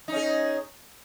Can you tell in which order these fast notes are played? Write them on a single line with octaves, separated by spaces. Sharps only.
D#4 C#4 G#4